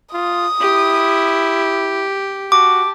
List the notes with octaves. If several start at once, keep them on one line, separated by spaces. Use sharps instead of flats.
F4 D#6
E4 G4
F#4 A5 D6